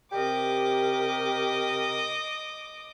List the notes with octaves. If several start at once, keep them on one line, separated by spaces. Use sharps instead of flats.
C3 G4 A#4 D#5 D6